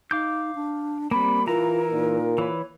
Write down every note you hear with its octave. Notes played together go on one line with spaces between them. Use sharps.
D#4 F5 D6 G6
D4
G3 A#3 C4 B5
E3 E4 F4 A#4 A#5
A#2 D#4
E3 B4 C#5